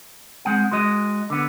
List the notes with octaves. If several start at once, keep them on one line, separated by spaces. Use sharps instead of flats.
G#3 C4 F#5
G#3 F#4 D#5
D3 B3